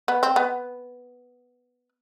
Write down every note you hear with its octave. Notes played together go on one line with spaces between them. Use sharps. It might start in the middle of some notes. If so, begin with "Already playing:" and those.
B3
C4
B3